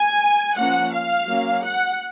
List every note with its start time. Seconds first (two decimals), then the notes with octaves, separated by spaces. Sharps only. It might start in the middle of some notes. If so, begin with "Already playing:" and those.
Already playing: G#5
0.58 F3 A#3 C#4 F#5
0.93 F5
1.28 F#3 A#3 C#4
1.63 F#5